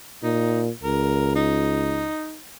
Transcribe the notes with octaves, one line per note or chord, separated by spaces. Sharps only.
A#2 D#4
C#2 A#4
D#4